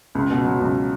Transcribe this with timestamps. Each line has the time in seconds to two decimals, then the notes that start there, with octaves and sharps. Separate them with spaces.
0.15 C#2
0.30 B2
0.45 F#3
0.60 C#2